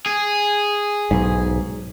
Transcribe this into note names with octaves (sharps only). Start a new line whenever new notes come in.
G#4
B1 G#2